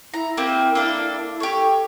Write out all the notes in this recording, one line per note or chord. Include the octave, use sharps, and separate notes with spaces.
E4 A#5
A#3 C4 G4
A#3 D4 A4
G4 A4 C#5